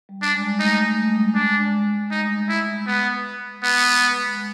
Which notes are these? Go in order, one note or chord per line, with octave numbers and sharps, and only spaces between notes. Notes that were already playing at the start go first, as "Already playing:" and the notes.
G3
D4
G#3
A3 D#4
A3
A3
G3
G#3
G#3 D4
D#4
E4
B3
B3
G#3